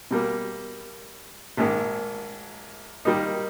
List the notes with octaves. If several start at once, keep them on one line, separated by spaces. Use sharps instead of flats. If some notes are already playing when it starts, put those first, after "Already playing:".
B2 G3 A#3
A#1 G#2 D#3
D#3 G3 A#3 D#4